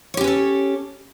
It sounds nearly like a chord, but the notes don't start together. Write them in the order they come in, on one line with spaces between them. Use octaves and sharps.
C#5 G4 C#4 B4 A4